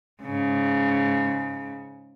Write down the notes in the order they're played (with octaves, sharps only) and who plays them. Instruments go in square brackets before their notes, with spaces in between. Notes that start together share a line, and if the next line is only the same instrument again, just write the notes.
[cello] G#2 C#3